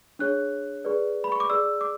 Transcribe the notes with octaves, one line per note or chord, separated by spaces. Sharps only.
D4 G#4 C#5 F#6
G#4 B4 D5
B5
C#6
D6
G#4 D5 E6
D6